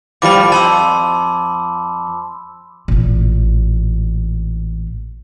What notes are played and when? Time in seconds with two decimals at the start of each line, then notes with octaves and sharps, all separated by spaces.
0.22 A2 F3 G3 B5 D6
0.52 F2 A5 C6 E6
2.88 A1 A#2